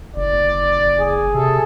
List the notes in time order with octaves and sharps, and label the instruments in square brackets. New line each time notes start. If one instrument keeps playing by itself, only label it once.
[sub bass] F#1 [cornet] D5
[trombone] G#4
[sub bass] C3 [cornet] A4